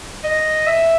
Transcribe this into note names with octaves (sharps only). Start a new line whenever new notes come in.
D#5
E5